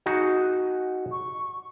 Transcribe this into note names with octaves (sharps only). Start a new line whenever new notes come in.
D#4 F#4 G#4
C#6